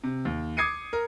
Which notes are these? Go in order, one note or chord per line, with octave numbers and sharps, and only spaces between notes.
C3
D#2
D6 D#6 G#6 C7 C#7 D#7
A#4